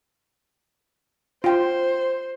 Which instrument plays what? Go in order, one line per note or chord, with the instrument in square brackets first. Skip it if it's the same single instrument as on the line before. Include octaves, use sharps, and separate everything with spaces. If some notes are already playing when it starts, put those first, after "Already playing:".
[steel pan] F4 G5 [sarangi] C5